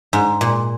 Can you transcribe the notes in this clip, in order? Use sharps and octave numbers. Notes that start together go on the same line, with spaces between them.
G#2
A#2